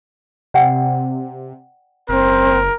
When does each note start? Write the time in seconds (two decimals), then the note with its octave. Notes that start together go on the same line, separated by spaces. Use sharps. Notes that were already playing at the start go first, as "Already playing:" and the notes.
0.54 C3 D5 F#5 G5
2.09 F#1 C4 A#4